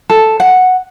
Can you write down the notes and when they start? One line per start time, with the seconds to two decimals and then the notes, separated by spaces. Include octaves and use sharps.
0.10 A4
0.40 F#5